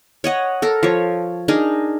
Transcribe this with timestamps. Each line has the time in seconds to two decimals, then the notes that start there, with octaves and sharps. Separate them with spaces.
0.24 C#5 D#5 F#5
0.62 A4 A#4
0.83 F3 C#5
1.48 D4 D#4 G#4 A#4